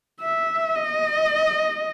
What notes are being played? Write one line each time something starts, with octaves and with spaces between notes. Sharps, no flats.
E5
D#5